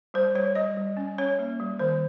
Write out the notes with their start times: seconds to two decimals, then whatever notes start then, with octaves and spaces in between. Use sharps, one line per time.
0.14 G3 C5
0.35 G3 C#5
0.55 G3 D#5
0.77 G3
0.97 C#4
1.18 C#4 C#5
1.39 A#3
1.60 G3
1.79 D#3 C5